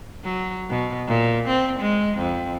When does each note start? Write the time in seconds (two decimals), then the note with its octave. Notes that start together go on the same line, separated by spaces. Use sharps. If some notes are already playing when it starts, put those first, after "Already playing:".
0.24 F#3
0.70 B2
1.07 A#2
1.48 C4
1.80 G#3
2.18 F2